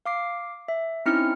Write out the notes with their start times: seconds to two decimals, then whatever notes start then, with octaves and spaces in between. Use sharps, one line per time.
0.06 F5 D6 C7
0.68 E5
1.06 C4 C#4 D#4 E4 F6 C#7